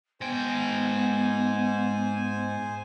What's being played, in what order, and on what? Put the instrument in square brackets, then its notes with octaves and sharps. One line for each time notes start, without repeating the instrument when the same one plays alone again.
[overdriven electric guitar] G#2 G5 [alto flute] B3 [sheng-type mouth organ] C5 G#5